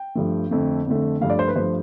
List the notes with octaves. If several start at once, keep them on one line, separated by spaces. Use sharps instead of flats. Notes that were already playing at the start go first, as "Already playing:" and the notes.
Already playing: G5
G2 F3 A3
F2 D3 A3
F2 D3 A3
G2 F3 A3 F5
D5
C5
B4
G2 F3 A3 C5